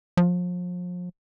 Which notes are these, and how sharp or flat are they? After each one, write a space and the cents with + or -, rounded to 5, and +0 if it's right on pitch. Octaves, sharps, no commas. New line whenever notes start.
F3 +35